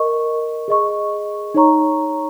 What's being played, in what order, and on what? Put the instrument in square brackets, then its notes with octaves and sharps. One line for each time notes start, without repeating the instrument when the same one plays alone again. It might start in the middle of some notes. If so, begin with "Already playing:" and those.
Already playing: [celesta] A#4 D#5 C#6
G#4 D#5 C#6
D#4 C#5 A#5 C#6